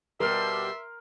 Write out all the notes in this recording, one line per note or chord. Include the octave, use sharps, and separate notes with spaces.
B2 G3 A#4 E5 C6 F6